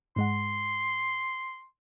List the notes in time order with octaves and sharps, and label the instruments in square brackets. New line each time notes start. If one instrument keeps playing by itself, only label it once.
[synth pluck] G#2 G#3 F#5 [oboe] C6